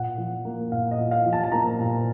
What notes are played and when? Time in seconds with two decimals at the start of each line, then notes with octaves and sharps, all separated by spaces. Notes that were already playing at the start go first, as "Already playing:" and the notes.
Already playing: A#2 F#5
0.18 F3
0.45 A#3
0.72 A#2 F5
0.91 D#5
0.99 A#2
1.11 F5
1.26 F3
1.33 A5
1.44 A5
1.52 A#3 A#5
1.80 A#2